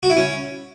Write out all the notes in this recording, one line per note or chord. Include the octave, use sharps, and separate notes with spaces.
F#4
E4
C#4